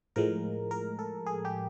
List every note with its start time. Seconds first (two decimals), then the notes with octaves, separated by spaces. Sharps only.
0.16 A2 F3 G#3 A#4
0.71 A#4
0.99 A4
1.26 G#4
1.45 G4